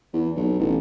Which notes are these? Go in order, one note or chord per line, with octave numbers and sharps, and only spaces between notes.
E2
B1
A1